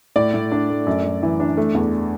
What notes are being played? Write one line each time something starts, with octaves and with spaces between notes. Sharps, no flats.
A2 D5
A2
D4
A3
F#2
F#2
E3
D4
A3
E2